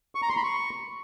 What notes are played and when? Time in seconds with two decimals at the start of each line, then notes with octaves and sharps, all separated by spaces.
0.15 C#6
0.22 A#5
0.29 C6
0.36 B5
0.44 C#6